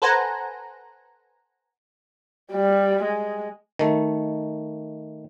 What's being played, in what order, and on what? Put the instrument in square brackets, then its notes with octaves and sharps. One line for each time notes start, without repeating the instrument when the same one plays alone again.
[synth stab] A4 B4 C5 F#5 G#5 A#5
[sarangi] G3
G#3
[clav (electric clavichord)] D#3 A3